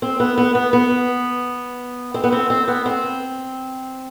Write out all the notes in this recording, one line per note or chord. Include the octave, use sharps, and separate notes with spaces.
C4
B3
B3
B3
B3
C4
B3
C4
C4
B3
C4